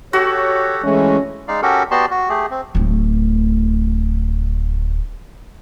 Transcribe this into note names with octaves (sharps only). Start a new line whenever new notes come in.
F#4 G4 A4 C#5
E3 G#3 A3 C#4
G#3 D#4 D5 F5
C#4 F#4 G4 A4 A#4
B3 F#4 G4 D5 A5 C6
F#4
A3 G4 G#4
C4
D1 A3